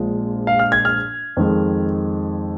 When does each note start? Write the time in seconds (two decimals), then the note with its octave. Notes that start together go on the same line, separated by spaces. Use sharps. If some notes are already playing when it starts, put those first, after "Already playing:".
Already playing: A#1 A#2 F3 G#3
0.47 F5
0.59 F6
0.72 G#6
0.85 F6
1.37 F2 D#3 G#3